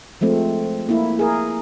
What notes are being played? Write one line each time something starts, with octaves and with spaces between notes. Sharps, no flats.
F3 G#3 A3 C4
A#3 E4
G#4 A#4